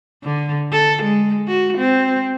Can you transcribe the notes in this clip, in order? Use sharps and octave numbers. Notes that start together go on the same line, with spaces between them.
D3
A4
G#3
F#4
C4